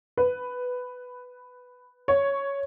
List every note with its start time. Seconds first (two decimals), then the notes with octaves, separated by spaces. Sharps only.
0.17 B4
2.08 C#5